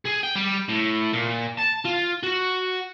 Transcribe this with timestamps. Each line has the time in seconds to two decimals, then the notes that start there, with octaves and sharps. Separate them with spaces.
0.05 G#4
0.23 G5
0.35 G3
0.69 A2
1.13 A#2
1.59 A5
1.85 F4
2.23 F#4